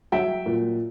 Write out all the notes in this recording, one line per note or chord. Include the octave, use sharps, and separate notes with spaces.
F#3 E5 G5
A#2